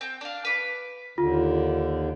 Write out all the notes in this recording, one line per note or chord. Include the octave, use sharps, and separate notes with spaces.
C4 G5
D4 F5
B4 D6
D#2 D3 F4